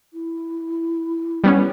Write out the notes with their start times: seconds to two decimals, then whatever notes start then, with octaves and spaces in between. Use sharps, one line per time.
0.13 E4
1.44 G3 B3 C#4